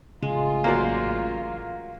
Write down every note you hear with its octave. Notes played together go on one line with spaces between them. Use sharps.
A1 C#3 G#3 F4
F#3 A#3 C5 D5